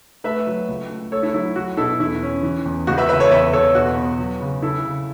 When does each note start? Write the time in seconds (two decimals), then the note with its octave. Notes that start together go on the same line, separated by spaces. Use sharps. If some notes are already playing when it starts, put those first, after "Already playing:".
0.24 A3 B4 E5
0.47 F#3
0.68 C#2
0.90 A3
1.12 A3 A4 C#5
1.23 E4 A4
1.34 F#3 E4
1.56 F#3 F#4
1.77 B2 E4 A4
2.00 E2 E4
2.22 C#4
2.43 E3
2.66 E2
2.87 C#2 F#4
2.98 B4 E5
3.09 C#3 B4 E5
3.20 A4 C#5
3.31 E2 B4 E5
3.53 E2 A4 C#5
3.75 B2 F#4
3.96 B3
4.19 F#3
4.40 C#3
4.62 C#3 E4 A4
4.85 C#3